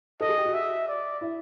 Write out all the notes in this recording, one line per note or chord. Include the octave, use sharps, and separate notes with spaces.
A4 D#5
G#4
G4
F#4
E5
D5
E4